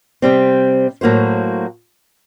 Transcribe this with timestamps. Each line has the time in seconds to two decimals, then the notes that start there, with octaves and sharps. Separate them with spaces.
0.22 C3 G3 C4
1.01 A2 F#3 A#3 F#4 C5